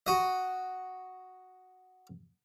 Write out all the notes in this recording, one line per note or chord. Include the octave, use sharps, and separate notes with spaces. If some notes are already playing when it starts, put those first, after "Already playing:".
F#4 D#5